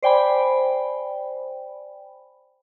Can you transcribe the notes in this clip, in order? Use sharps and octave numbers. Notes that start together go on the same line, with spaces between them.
C5 D5 G5 G#5 B5